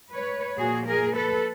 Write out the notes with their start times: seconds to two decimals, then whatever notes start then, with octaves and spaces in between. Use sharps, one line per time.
0.13 B4 C#5
0.57 A#2 F3 A#3 F#4 G#4
0.86 G#4 A#4
1.15 A4 B4